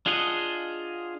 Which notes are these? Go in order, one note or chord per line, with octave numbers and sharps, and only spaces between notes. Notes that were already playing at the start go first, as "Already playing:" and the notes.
D4 F4 G#4 D#5 F#5